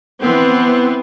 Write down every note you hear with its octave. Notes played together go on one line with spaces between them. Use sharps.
E3 B3 C4